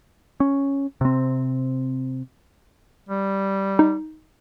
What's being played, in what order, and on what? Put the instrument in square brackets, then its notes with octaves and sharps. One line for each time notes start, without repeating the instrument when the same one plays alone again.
[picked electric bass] C#4
C3 C4
[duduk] G3
[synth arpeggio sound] D#4